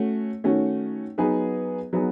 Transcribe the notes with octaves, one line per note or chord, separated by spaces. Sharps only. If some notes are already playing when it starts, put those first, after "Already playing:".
Already playing: A3 C#4 F#4
D#3 A3 C#4 F#4
F#3 B3 D#4 G#4 B4
F#3 B3 D#4 G#4